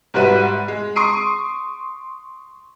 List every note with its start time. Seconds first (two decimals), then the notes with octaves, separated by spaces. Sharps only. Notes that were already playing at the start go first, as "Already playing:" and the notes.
0.14 G#2 G3 F#4 B4 E5 D#7
0.68 G#3
0.96 C6 C#6 D#6 C7 D7 D#7